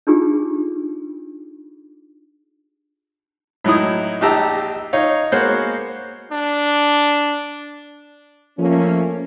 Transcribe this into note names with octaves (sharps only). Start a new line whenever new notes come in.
D4 D#4 F4 G4 G#4
A2 F#3 D#4 E4 D#6
A#1 D#4 G4 A5 A#5 E6
D#4 C#5 F5
G#3 A#3 B3 F#4 C5 C#5
D4
F3 A3 A#3 C#4